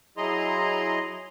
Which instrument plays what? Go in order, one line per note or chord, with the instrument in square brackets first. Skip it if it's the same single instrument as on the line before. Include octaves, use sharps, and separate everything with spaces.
[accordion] F#3 E4 G#4 D#5 A#5 C6